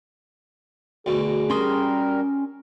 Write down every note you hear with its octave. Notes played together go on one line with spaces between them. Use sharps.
D2 B2 G#4
G3 C#4 F#4 A#4 C6 D#6